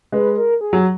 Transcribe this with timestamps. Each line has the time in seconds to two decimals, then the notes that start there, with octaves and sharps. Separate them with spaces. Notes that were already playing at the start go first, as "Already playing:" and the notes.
0.12 G#3 B4
0.37 A#4
0.61 G#4
0.73 F#3